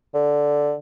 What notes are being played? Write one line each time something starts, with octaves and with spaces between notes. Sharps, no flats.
D3